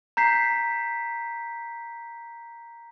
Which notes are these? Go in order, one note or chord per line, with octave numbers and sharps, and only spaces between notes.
A#5 G6 B6 C7